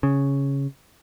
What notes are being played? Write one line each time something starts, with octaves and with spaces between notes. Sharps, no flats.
C#3